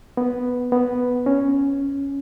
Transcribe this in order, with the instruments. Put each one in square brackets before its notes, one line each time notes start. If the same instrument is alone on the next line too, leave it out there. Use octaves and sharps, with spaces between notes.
[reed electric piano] B3
B3
C#4